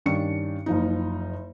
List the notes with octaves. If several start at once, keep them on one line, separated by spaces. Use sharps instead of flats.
G2 D#3 C#4 D4 C#6 C#7
F#1 F3 D#4